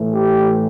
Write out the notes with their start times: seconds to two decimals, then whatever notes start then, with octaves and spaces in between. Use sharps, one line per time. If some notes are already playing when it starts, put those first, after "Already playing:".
Already playing: A2 E3 A3
0.12 G4